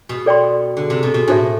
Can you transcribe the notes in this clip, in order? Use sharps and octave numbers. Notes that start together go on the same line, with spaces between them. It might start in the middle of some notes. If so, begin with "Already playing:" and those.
B2
A4 D5 G5 C6
D3
C3
B2
B2
A2 D4 F#4 A4 C5 E5